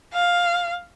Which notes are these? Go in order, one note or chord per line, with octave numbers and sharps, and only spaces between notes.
F5